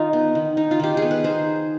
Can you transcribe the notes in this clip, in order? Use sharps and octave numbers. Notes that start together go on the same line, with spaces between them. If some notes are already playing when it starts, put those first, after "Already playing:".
Already playing: D#3 D#4 F4
B3
D#3
D#4
F4
D#3 G4
B3 G#4
B4
D#4 G#4 C5